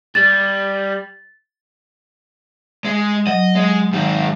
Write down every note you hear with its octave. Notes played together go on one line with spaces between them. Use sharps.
G3 A6
G#3
F#3 D#5
G#3
G#2 D#3